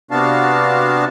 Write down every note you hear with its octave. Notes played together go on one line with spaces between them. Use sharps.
C3 B3 D4 F#4 F5 A5